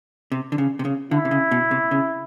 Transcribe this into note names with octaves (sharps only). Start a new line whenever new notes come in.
C3
D3
C#3
C3
C#3
D3 E4
C3
C#3
B2
C3
C#3